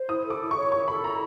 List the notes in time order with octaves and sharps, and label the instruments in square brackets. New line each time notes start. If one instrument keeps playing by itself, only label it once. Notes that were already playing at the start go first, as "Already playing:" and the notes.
Already playing: [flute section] C5
[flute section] E4 [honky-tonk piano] D#6
[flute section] A4
[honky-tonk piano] D6
[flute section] E4
[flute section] C#5 [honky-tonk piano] C#6
[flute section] E4 [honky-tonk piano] C#6
[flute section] A4 [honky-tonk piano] B5
[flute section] E4 [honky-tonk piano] A#5